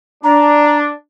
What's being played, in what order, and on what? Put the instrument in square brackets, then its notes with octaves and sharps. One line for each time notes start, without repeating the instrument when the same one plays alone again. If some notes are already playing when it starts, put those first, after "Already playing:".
[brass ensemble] D4 [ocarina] A#5